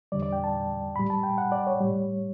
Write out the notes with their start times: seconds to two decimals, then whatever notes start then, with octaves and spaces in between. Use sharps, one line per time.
0.12 E2 D3 G3 D5
0.23 D5
0.33 G5
0.44 A5
0.96 A2 G3 B5
1.10 A5
1.23 G5
1.38 F#5
1.52 D5
1.67 C#5
1.81 A2 G3